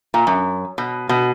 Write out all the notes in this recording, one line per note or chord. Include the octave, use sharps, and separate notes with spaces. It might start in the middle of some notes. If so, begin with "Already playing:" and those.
A#2
F#2
B2
B2